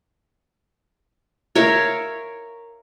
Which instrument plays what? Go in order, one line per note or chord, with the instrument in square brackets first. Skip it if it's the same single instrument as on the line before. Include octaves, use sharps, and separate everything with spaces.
[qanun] A#4 C#5 E5 F5